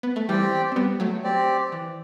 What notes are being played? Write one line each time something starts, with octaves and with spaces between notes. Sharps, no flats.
B3
A3
E3 G3 C4 G4 D5 G5
C4
G3 B3
F#3 A3
C4 G4 D5
E3